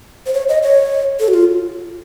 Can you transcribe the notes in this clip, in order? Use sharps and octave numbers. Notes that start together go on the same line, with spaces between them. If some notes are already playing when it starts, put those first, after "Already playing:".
C5
C#5
D#5
C#5
A4
F#4
F4